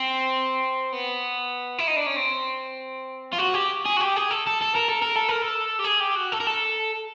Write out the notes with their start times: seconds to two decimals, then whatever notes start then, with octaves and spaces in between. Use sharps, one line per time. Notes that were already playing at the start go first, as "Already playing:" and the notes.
Already playing: C4
0.93 B3
1.79 E4
1.88 D#4
1.96 D4
2.06 C#4
2.16 C4
3.33 F4
3.38 F#4
3.54 G4
3.85 G#4
3.97 F#4
4.01 G4
4.16 G#4
4.31 A4
4.47 A4
4.62 A4
4.76 A#4
4.89 A4
5.02 A#4
5.16 A4
5.29 A#4
5.42 A4
5.80 G4
5.85 G#4
6.01 G4
6.16 F#4
6.32 A4
6.40 A#4
6.47 A4